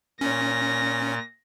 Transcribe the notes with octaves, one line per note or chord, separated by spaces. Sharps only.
A#2 C#4 A#6